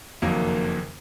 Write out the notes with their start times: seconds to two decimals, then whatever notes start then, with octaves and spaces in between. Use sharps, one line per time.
0.22 F#1 F2 D#3 F#3 A#3